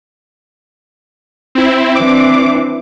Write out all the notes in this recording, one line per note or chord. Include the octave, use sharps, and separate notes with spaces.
C4 E4
E3 C4 D4 D6